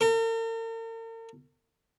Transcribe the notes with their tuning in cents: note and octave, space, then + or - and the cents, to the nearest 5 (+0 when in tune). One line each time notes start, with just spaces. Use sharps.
A#4 -45